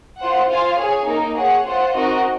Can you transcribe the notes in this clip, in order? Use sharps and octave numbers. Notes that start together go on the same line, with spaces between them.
F4 C5 F#5
F4 C5 F5 G#5
G#4 C#5 G#5
A#3 D#4 A#4
G#4 C#5 F#5
F4 C5 F#5
C4 D#4 F#4 A#4 D#5